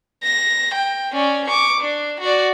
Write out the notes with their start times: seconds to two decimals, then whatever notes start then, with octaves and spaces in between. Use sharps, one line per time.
0.23 A#6
0.74 G5
1.13 C#4 D5
1.48 C#6 D6
1.81 D4
2.21 F#4 D5